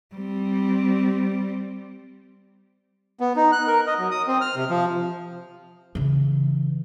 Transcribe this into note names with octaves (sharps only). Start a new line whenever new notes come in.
G3 C4
B3
D#4
F#6
A#4
D#5
F#3
D#6
C4
F6
C3
F3
C#3 E3